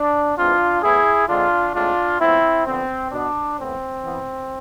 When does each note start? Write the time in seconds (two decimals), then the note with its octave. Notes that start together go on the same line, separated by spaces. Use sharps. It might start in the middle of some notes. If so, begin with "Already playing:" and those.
Already playing: D4
0.37 E3 G#3 C4 D4 F4
0.82 A2 E3 B3 E4 G#4
1.28 D3 G#3 C4 D4 F4
1.74 A2 G#3 C4 D4 F4
2.20 A2 F3 B3 C4 E4
2.65 D3 F3 B3 C4
3.11 B2 B3 D4
3.58 A2 E3 B3 C4
4.03 E3 B3